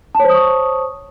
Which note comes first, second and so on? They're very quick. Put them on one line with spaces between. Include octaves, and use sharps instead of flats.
A5 C#5 C5 D#6 C#6